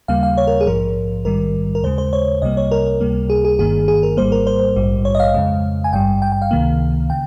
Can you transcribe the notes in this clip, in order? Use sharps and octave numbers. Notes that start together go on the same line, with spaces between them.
D#2 C#3 G3 A#3 F5
F5
C#5
A#4
G#4
A#1 G#2 F3 A#4
A#1 G#2 D#3 G3 A#4
A#4
D#2 C#3 G#3 C5
C5
C#5
C2 C3 G3 A#3 D#5
C#5
A#4
C#2 C3 G3 A#3
G#4
G#4
G1 G2 D#3 A#3 G#4
G#4
A#4
G#1 G#2 G3 A#3 C5
A#4
C5
A#1 G#2 G3
C#5
D#5
F5
F2 C#3 G#3
G#5
G#1 G2 G3 G5
G5
G5
F5
C#2 C3 D#3 A#3
C#3 G5